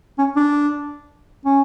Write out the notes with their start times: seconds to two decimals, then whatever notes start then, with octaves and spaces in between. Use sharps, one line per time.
0.18 C#4
0.36 D4
1.45 C#4